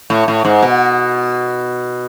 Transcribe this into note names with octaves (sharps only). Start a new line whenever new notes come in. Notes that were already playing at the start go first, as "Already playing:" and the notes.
A2
A2
G#2
B2